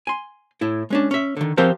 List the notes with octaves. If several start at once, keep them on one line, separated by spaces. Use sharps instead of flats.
G#5 C6
A2 E4
G#3 C#4 D4
C#4 E5
D3 D#3
F3 C4 F#4 G4 A#4 C5